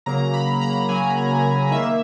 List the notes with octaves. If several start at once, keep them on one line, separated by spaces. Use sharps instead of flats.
C#3 F#3 A#3 A#5
B5
A#5
C#3 F#3 A#3 G#5
D#3 A#3 E5